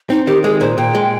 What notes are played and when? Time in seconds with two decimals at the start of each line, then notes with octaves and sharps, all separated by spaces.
0.10 C4 D#4
0.27 D#3 G4
0.44 G#3 G#4
0.61 A#2 C5
0.78 A#2 G5
0.95 G#3